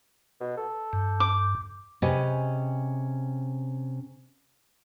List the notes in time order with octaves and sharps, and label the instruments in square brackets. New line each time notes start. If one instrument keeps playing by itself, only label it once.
[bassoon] B2
A4
[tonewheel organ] G2
[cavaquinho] D6
[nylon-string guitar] C3 C#4 G#4 B4 D#5